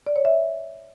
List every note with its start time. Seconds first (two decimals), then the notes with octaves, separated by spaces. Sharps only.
0.07 D5
0.16 C#5
0.25 E5